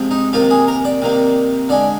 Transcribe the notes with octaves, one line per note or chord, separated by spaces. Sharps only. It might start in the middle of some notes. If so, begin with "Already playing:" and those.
Already playing: C3 F3 G#3
D#4
C3 D#3 A#3 F4
G#4
A#4
D5
C3 D#3 A#3
D3 G#3 D5